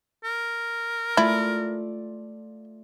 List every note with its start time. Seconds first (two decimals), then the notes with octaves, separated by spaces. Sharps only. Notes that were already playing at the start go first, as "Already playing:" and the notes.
0.24 A#4
1.17 A3 E4 F4 D5